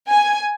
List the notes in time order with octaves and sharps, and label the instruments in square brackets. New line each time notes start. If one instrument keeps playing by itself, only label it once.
[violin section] G#5